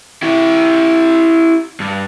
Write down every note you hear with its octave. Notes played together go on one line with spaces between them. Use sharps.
E4 G4
G2